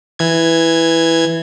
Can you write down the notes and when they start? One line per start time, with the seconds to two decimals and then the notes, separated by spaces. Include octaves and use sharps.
0.19 E3 G#6